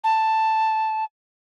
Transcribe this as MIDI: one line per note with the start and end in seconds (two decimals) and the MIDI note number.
0.04 1.04 81